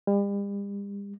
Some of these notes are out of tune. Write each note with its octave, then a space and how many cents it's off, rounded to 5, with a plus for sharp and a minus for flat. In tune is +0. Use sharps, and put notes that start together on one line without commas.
G3 +40